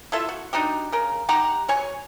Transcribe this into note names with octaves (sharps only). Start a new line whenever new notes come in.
E4 F4 A4 E5
F#4
D4 D#4 F#4 G4
C#3 A#4
D#4 G4 F#5 A#5
F#3 C#5 G#5 C#6